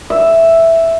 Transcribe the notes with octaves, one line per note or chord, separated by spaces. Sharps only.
E5